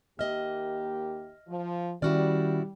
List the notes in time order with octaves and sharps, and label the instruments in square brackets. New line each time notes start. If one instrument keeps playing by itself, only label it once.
[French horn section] D#2 A#3 G4 [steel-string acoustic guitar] D#5 E5 [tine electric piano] F6
[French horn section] F3
[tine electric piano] D#3 C#4 F6 [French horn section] G3 [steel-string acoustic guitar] E4 F#4 D5